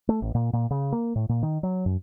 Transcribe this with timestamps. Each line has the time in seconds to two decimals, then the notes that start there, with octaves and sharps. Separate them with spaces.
0.09 A3
0.22 A1
0.35 A#2
0.53 A#2
0.70 C#3
0.92 A#3
1.15 A2
1.29 A#2
1.43 D#3
1.63 F#3
1.86 F#2